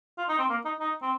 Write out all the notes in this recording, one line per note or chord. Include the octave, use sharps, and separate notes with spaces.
F4
D#4
C4
A#3
D#4
D#4
C4